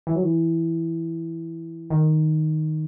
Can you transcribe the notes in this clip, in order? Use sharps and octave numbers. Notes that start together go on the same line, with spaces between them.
E3
F#3
E3
D#3